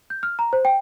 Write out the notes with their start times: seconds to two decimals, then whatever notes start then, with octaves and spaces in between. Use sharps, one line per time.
0.10 G6
0.23 F6
0.39 A#5
0.53 C5
0.65 G5